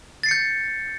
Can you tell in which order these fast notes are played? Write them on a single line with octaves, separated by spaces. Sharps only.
A6 C7 C#7 G6